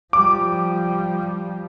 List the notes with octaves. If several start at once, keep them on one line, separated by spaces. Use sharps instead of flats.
F3 G3 D6